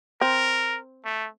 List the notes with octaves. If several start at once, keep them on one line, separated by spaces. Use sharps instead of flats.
C4 A#4
A3